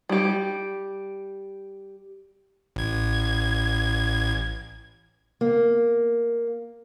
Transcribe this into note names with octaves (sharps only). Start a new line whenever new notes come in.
G3 G4
A1 G#6
A#3